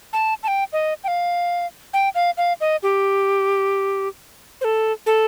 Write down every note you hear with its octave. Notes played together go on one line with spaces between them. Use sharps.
A5
A5
G5
D#5
G5
F5
G5
F5
F5
D#5
G4
C5
A4
A4